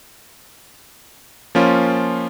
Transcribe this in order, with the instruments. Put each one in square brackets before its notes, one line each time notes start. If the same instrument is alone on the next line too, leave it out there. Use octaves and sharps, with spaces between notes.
[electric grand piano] F3 A#3 C#4 F4